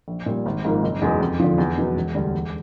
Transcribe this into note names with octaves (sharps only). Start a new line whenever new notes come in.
A#1
A#2 G3
G#1
G#2 F3 A#3
F#1
E2 B2 G#3
F2
D3 F3
E2
B2 F#3 B3
E1
D2 D3 G3
E1